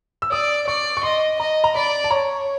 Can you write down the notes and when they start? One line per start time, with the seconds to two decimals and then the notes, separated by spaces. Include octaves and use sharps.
0.22 E6
0.31 D5 D#6
0.67 D5 C#6
0.97 C#6
1.03 D#5 C6
1.39 D#5 A#5
1.64 A#5
1.75 D5 B5
2.04 A5
2.11 C#5 A#5